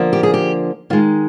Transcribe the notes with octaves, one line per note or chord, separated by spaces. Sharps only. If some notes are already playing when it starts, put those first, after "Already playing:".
Already playing: D3 F3 A#3
G4
G#4
G4
D#3 G#3 F4